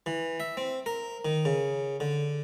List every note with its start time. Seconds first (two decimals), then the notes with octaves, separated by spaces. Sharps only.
0.06 E3
0.40 E5
0.57 C4
0.86 A#4
1.25 D#3
1.45 C#3
2.00 D3